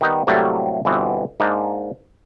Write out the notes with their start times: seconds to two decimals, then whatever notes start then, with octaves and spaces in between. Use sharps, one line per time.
0.01 D#3 G3 B3 D#4
0.27 A2 C3 F#3 G3 A3 A#3
0.85 G1 B2 E3 B3 C4
1.40 G#2 A#3 D4 D#4